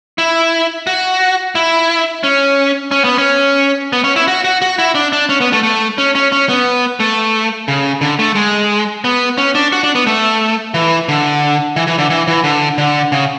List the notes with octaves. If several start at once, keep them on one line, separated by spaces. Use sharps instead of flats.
E4
F#4
E4
C#4
C#4
B3
C#4
B3
C#4
E4
F#4
F#4
F#4
E4
D4
D4
C#4
B3
A3
A3
C#4
C#4
C#4
B3
A3
C#3
D3
A3
G#3
B3
C#4
D4
F#4
D4
B3
A3
E3
D3
E3
E3
D3
E3
E3
D3
D3
C#3